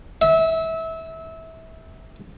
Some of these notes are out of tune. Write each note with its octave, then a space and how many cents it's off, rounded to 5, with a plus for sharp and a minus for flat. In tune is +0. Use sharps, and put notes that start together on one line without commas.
E5 -25